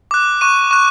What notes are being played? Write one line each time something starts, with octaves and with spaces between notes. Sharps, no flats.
D6 F#6
C#6 F#6 D#7
C#6 F#6